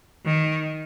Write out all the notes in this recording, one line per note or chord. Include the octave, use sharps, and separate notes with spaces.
D#3